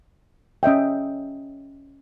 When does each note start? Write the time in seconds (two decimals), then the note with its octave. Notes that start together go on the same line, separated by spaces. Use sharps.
0.63 C#4 D#5 E5 G5